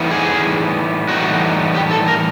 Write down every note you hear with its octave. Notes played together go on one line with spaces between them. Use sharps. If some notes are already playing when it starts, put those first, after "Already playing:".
Already playing: A2 E3 G3 B3 D#4
G#4
A2 E3 G3 B3 D#4 F#4
G4
A4
A#4